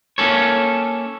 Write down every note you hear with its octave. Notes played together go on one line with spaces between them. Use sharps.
A#3 C#4 A4 C#5